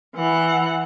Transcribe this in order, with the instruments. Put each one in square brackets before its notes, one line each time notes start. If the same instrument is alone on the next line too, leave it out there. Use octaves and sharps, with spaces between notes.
[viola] E3 F#5